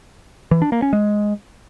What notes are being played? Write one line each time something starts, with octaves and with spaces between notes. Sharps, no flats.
E3
D4
A#3
C#4
G#3